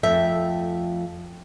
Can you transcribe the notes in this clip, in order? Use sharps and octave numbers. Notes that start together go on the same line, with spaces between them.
F2 A3 E5 G5